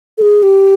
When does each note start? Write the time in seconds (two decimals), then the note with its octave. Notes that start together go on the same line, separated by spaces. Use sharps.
0.18 A4
0.22 G#4
0.43 G4